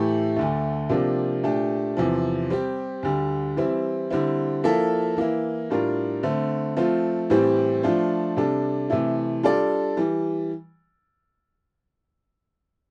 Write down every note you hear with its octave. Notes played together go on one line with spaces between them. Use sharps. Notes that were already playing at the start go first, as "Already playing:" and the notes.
Already playing: A2 E3 A3 E4 G4
D2 D3 A3
C3 F3 A#3 D4 G4
A#2 A3 D4 G4
E2 C3 F3
G3 C4 G4
D2 D3 G3
E3 G3 C4 E4
D3 G3 C4 E4
F3 A#3 E4 A4 E5
E3 A#3 E4
A2 G3 D4 F4 A#4
D3 A3 C4
F3 A3 C4 F4
A2 E3 G3 C4 G4
F3 A3 D4 F4 C5
C3 G3 D4 A4
C3 E3 A3 E4
G3 D4 F4 A4 D5
E3 G3